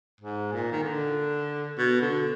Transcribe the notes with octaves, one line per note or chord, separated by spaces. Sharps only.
G#2
A#2
D#3
D3
B2
D3